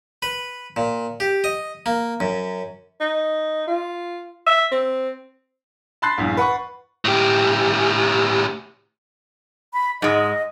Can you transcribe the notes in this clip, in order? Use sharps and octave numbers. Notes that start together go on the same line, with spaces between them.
B4
A#2
G4
D#5
A#3
F#2
D#4
F4
E5
C4
A5 B5 C6 F#6 A6 C7
A#1 E2 G2
B4 F#5 B5 C#6
A2 G4
B5
G#2 G#3 D#5